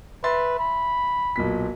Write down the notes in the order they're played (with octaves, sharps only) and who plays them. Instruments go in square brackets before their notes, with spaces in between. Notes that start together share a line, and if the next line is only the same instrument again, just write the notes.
[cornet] B4 [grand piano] E5 C6 A6
[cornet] B5
[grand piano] B1 A#2 B6